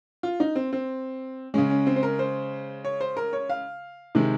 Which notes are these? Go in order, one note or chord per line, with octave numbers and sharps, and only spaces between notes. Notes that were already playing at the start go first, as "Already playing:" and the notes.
F4
D#4
C4
C4
C#3 G#3 C#4
C#4
C4
C5
A#4
C5
C#5
C5
A#4
C#5
F5
C3 D#3 G#3